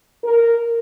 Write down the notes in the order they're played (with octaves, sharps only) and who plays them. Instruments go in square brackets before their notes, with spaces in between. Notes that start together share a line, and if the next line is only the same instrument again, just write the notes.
[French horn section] A#4